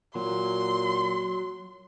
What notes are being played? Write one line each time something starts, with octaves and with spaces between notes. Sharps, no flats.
A#2 F#3 C6